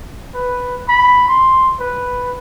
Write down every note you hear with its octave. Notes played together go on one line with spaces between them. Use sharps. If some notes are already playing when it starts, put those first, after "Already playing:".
B4
B5
C6
B4